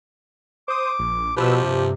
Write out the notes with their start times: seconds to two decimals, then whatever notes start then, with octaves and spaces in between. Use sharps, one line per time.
0.68 C5 D6 D#6
0.99 A#1
1.37 B2 F3 G4 B4 E6
1.63 G2 C3